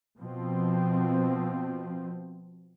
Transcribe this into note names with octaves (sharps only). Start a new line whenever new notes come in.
B2 F3 C4